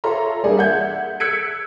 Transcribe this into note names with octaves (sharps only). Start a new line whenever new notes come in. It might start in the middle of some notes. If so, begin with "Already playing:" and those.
F4 A4 C#5 E5 A#5 C6
G3 A#3 D4 G#4 A4
E5 F#5 G6 G#6
E6 F#6 G#6 B6 C#7 D7